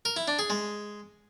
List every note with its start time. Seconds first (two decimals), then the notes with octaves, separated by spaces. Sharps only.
0.05 A#4
0.16 E4
0.28 D4
0.39 G#4
0.50 G#3